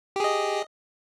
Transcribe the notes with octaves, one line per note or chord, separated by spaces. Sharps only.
G4 G#4 D#5